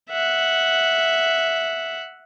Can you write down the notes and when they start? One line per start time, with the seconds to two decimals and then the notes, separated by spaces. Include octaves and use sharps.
0.10 E5 F#5